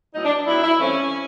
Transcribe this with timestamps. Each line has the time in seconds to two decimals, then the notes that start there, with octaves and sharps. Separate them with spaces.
0.14 A2 F#3 B3 D#4
0.25 D4
0.47 A2 F#3 B3 E4
0.63 E4
0.80 G2 E3 A3 C4 C#4